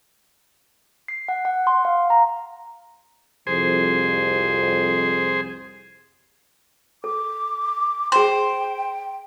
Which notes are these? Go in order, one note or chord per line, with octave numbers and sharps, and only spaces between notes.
C7
F#5
F#5
C6
F5
A#5
C2 F2 G#4 C5
A4 D6
G#4 C5 G5 C6